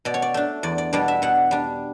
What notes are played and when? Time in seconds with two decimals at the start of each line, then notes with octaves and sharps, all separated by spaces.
0.05 B2 D5
0.14 C#5
0.22 D5
0.34 A3 D4
0.63 E2 D5
0.78 D5
0.93 B2 G3 D4 D5
1.08 E5
1.22 B2 F#5
1.51 G3 D4